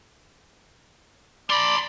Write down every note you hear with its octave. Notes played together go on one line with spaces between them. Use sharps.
D5 B5 C6